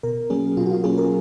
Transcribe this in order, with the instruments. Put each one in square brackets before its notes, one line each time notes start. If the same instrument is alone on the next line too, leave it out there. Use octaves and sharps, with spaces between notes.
[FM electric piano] B2 A#4
F#3 A#3 C#4 G#4
B2 F4
F#4
F4
F#3 A#3 C#4 G#4
A#4